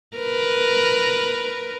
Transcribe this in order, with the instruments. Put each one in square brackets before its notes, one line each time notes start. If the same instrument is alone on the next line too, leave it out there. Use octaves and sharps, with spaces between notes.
[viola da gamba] A#4 B4